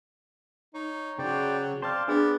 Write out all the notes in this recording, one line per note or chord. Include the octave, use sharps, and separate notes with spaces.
D#4 C#5
C#3 F#3 C5 D5 G5
C4 C5 D5 F5 A5
B3 D4 G#4 D5